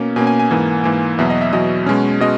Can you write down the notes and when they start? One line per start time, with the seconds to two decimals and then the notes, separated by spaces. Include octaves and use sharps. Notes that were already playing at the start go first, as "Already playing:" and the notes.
Already playing: B2 A#3 C#4
0.16 B2 A#3 C#4 G#5
0.27 G#5
0.39 G#5
0.51 G#2 E3 A#3
0.84 G#2 E3 A#3
1.18 E2 B2 F#3 E5
1.30 D#5
1.41 E5
1.53 E2 B2 F#3 D#5
1.86 B2 G#3 C#4
2.20 B2 G#3 D#5